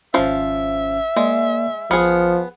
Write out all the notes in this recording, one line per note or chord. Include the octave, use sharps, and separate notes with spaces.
G#1 F3 C#4 E5 F5
G#3 A#3 D5
A1 F3 B3 G#4 F6 C#7